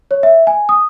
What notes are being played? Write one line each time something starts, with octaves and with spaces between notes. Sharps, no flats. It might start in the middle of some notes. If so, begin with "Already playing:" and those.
C#5
E5
G#5
D#6